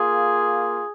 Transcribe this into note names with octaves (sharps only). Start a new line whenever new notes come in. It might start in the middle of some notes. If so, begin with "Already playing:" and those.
Already playing: A#3 F4 G#4